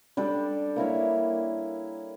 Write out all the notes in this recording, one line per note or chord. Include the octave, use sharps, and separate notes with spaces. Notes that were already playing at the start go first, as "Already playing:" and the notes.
G3 D4 A4 D5
A#3 E4 A#4 C#5